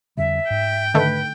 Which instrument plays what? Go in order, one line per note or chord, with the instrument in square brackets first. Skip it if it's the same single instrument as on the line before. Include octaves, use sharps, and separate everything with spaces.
[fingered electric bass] F2 D3 G3 [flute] E5
[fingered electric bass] G#2 [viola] G5
[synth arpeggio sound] D3 D#3 A3 [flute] B4